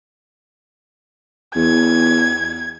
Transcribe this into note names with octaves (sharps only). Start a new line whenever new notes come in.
E2 G#6